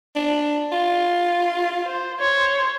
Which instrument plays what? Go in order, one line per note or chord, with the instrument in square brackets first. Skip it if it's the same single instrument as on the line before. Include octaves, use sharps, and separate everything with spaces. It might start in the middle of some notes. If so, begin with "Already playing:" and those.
[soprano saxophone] D4
F4
[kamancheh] C5
C5 C#5